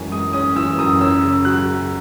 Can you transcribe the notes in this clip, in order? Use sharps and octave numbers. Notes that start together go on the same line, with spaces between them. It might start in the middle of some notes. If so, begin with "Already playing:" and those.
Already playing: F#2 E3 G#3 C#4 G#5
G#3 D#6
C#4 D#6
E3 E6
F#2 D#6
C#4 E6
C#3
F#3 F#6
C#3